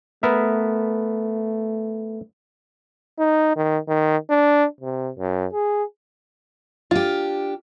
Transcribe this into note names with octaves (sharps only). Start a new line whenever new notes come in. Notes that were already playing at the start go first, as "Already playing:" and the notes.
A3 B3 A#4 E5
D#4
D#3
D#3
D4
C3
F#2
G#4
D4 F4 G4